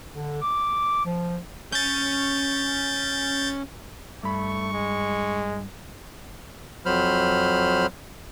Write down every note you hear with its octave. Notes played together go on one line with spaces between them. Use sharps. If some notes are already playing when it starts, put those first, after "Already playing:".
D3
D6
F3
C#4 G6 A6
G2 A3 B5 C#6
G#3
F2 F#3 C5 B5 F6